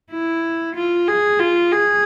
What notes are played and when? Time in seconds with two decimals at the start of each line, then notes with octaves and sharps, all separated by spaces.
0.12 E4
0.76 F4
1.08 G#4
1.39 F4
1.72 G#4